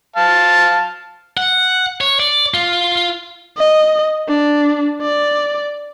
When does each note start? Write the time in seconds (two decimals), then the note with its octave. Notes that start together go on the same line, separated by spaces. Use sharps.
0.16 F5 A5
1.37 F#5
2.01 C#5
2.20 D5
2.54 F4
3.57 D#5
4.28 D4
5.02 D5